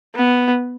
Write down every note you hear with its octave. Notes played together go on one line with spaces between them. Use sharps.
B3